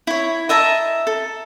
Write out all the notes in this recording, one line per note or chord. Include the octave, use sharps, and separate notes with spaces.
E4 C#5
D#5 E5 A5 A#5
A4